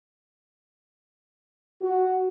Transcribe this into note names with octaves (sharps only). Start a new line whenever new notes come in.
F#4